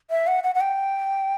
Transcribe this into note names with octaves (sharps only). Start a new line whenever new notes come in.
E5
F#5
F#5
F#5
G5